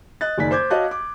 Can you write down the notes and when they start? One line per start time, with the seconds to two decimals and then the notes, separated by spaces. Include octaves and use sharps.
0.21 D#5 F#6 A6
0.38 F#1 D#3 D5 G#5 B6
0.51 C5 D6 G6 G#6
0.70 F#4 C#5 D#5 F5 A5 F#6
0.91 D6